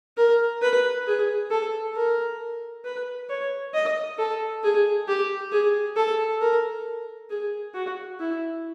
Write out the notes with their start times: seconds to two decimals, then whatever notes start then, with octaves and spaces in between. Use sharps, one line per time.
0.17 A#4
0.62 B4
1.07 G#4
1.51 A4
1.96 A#4
2.85 B4
3.30 C#5
3.74 D#5
4.18 A4
4.64 G#4
5.08 G4
5.52 G#4
5.97 A4
6.41 A#4
7.30 G#4
7.75 F#4
8.20 E4